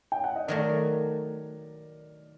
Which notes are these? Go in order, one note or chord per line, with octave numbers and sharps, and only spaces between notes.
G5
F#5
D#5
D#3 F#3 A3 A#4 D5